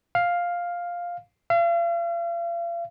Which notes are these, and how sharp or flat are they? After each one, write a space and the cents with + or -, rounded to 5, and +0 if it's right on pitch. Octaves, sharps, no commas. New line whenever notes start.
F5 +5
F5 -40